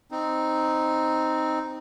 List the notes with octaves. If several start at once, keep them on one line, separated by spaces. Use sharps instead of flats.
C4 D#4